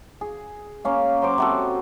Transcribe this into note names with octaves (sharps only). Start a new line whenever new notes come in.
G#4
A#3 C#4 F5
F#3 C5 D6
C3 F#4 A4